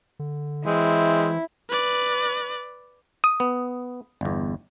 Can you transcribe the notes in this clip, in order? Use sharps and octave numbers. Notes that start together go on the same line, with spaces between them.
D3
E3 G#3 C4 E4
B4 D5
D#6
B3
G1 E2